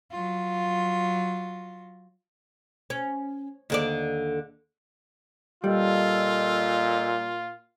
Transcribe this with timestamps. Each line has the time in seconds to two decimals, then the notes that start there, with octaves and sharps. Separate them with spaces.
0.11 F#3 F4
2.90 C#4
3.70 D#2 D3 D5
5.64 A#2 G3 F4 A4 D#5 E6